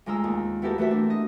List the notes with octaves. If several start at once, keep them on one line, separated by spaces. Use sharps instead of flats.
D2 G#3 F4 A#5 E6
D#2
B3 E4 F#4 G4 A4 A#4
E3 A3 F#4 A#4 C5 E5
D4
D#5